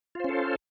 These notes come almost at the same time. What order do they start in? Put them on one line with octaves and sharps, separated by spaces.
F4 C5 C#4 A4